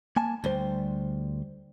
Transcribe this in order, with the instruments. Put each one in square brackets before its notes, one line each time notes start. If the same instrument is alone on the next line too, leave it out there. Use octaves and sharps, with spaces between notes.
[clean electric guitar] A#3 G#5 A5
[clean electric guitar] D2 C5 [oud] G3